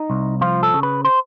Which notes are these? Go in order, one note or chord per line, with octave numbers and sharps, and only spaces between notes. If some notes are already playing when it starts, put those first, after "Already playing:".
Already playing: D#4
C2
F3 F4
A4
C#3
B4
C5